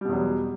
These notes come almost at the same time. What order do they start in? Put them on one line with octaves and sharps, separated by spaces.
G3 B2 E2 F#3